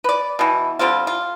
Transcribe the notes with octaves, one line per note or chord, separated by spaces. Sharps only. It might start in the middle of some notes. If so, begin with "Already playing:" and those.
B4 D5
B2 E3
D3 G3 C4 F4
F4